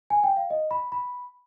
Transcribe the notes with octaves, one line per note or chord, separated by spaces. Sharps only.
G#5
G5
F5
D#5
B5
B5